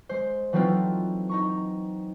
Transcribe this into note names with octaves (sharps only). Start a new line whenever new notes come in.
G#3 C5
E3 F#3 A3 C4 D#4 F4
D#4 A#5 C#6